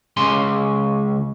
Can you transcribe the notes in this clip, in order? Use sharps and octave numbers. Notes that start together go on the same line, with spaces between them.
C#2 C#3 G#5 C6